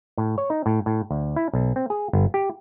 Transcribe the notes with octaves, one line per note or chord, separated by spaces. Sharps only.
A2
C#5
D#4
A2
A2
D2
E4
B1
C4
G#4
G1
G4